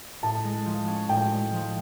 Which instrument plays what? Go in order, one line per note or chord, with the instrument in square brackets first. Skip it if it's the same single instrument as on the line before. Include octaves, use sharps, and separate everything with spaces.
[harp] A2 [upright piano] A5
[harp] G#3
F3
C#4
[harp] A2 [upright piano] G5
[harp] G#3
F3